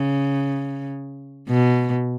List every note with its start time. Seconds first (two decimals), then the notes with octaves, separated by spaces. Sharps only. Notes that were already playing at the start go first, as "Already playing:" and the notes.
Already playing: C#3
1.49 B2